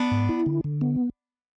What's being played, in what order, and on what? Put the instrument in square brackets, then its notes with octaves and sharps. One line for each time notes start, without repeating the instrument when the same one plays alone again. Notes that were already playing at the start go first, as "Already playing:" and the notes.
Already playing: [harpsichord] B3 D4
[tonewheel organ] G#2
E4
D3
D3
B3